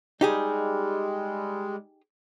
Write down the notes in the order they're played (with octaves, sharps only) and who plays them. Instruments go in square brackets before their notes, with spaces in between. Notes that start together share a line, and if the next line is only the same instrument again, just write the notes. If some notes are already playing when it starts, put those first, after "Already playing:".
[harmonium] G3 G#3 [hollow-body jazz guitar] D#4 G4 G#4